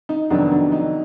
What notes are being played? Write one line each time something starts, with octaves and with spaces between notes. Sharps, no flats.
D#4
F2 C3 D#3 F#3 B3 D4
D4
D#4